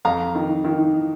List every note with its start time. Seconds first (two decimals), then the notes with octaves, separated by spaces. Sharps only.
0.05 F2 F5 A#5
0.35 D#3
0.64 D#3